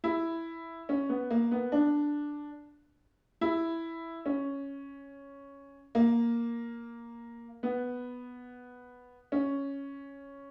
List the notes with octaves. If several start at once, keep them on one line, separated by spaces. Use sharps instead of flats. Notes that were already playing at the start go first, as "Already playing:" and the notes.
E4
C#4
B3
A#3
B3
D4
E4
C#4
A#3
B3
C#4